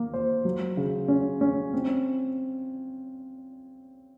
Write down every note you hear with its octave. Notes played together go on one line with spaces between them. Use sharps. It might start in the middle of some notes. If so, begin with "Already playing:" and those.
Already playing: A#3
C5
F#3
C#3
C#4
C#4
C4